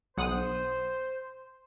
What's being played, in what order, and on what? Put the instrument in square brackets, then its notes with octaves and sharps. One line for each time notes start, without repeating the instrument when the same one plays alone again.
[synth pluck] B1 F#5 D#6 [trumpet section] C5